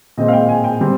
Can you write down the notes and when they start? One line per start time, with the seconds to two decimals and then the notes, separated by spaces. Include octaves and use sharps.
0.17 A#2 G#3 C4 D#5
0.28 F5
0.33 G5
0.48 G#5
0.64 G5
0.81 G3 C4